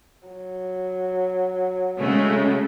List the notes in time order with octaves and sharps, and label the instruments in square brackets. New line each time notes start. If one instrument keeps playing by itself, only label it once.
[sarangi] F#3
[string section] C#3 G#3 A3